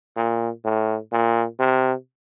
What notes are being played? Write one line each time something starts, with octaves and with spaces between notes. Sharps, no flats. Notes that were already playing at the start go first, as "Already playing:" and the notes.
A#2
A2
A#2
C3